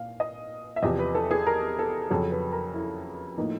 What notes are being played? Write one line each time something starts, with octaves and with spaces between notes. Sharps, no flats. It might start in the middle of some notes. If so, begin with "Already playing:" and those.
Already playing: A#2 F5
D#5
E5
E2 C3 F3 D#5
B4
A4
G#4
A#4
A4
F2 C#3 F#3 A4
B4
A#4
E4
A2 F3 A#3 D#4